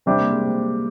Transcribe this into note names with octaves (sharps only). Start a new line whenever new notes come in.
C3 G3 C4 D4 G4
A#3
G#3
A#3